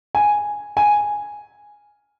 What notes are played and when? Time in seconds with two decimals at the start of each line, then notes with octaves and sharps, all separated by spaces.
0.15 G#5
0.77 G#5